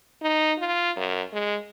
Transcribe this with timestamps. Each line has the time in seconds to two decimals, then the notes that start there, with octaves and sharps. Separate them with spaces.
0.22 D#4
0.59 F4
0.96 F#2
1.33 G#3